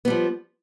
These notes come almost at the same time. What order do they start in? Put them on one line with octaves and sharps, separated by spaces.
B3 G3 F3